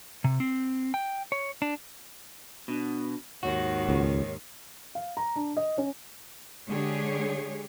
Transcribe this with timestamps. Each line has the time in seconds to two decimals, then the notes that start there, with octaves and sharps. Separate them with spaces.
0.24 C3
0.40 C4
0.94 G5
1.32 C#5
1.62 D4
2.68 B2 D4
3.43 D#2 G#2 D#3 F#4 C#5
3.89 C#2
4.95 F5
5.17 A#5
5.36 D4
5.57 D#5
5.78 C#4
6.68 D3 G#3 G4 G#4 C#5